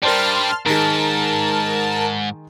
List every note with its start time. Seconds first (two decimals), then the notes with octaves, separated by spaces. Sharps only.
0.03 G2 G3 A#4 C5 D5 A5 C6 F6
0.66 G#2 D#3 G#3 A#4 A5